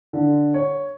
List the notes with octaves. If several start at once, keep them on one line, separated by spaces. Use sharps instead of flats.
D3
C#5